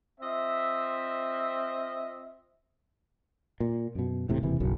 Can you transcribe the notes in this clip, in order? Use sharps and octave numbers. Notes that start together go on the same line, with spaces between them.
C4 F4 D#5 E5
A#2
F#2 B2
E1 A2 C3
E1 D#2 C3 E3
F#1 B1 F#2 F#3